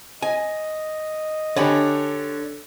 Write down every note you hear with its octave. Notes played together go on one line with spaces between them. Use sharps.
D#5 G#5
D3 D4 G4 C#5 G#5 B5